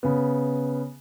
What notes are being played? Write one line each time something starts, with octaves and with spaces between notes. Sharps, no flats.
C#3 B3